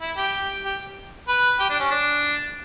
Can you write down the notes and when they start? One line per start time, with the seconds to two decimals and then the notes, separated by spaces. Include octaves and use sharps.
0.01 E4
0.17 G4
0.65 G4
1.28 B4
1.60 G4
1.70 D4
1.80 C#4
1.91 D4